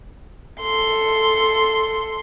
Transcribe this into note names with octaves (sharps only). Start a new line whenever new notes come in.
A4 C6